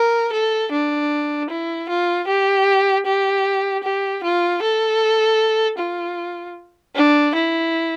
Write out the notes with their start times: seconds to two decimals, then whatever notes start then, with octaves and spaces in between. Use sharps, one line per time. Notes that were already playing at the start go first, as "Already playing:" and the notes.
Already playing: A#4
0.33 A4
0.72 D4
1.50 E4
1.89 F4
2.27 G4
3.06 G4
3.83 G4
4.23 F4
4.62 A4
5.78 F4
6.96 D4
7.34 E4